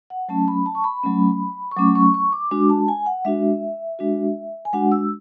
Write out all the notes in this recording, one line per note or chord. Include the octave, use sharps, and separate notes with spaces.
F#5
F#3 A3 C#4 A5
B5
A5
C#6
B5
F#3 A3 C#4
C#6
F#3 A3 C#4 D6
C#6
C#6
D6
G#3 D4 F#4 D6
A5
G#5
F#5
G#3 D4 F#4 E5
G#3 D4 F#4
G#5
G#3 D4 F#4 F#5
E6